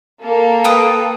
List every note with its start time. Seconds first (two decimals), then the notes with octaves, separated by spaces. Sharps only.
0.21 A#3 A4
0.64 B4 G5 D#6